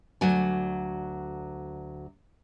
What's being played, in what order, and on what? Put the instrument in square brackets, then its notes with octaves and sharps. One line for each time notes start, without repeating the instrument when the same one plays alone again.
[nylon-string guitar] D2 F#3 D5 G#5